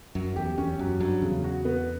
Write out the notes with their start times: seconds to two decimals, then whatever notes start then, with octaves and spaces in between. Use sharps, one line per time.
0.15 F#2 F#3
0.36 E2 G4
0.58 E2 C#4
0.79 F#2 F#3
1.00 G2 F#3
1.22 E2 C#3
1.44 F#4
1.65 B3